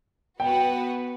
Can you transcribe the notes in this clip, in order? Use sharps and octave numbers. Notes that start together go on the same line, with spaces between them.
B3 F#4 B4 F#5 G5